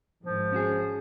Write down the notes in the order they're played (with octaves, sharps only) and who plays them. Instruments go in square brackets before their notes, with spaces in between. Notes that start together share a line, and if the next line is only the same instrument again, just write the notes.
[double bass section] G#1 G#2 [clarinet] F3
[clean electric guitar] C#4 F#4 G#4